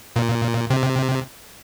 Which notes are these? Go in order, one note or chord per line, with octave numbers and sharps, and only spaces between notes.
A#2
C3